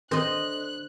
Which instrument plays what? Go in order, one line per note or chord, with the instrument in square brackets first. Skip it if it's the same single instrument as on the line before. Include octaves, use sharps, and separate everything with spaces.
[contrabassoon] D3 [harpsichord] D#3 C4 A4 [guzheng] C5 D#5 [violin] F#6